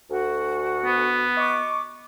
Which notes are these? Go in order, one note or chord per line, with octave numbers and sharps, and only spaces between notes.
D2 F#4
B3
D#5 C#6 D6